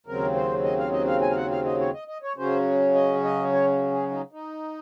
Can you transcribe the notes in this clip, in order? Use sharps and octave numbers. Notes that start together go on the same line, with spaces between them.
D#2 C#3 F#3 C4 A#4
C5
D#5
F5
D#5
F5
G#5
F5
F#5
F5
D#5
C#5
D#5
D#5
C#5
C#3 F#3 C#4 C5
D#5
D#5
C#5
G#4
D#4
D#4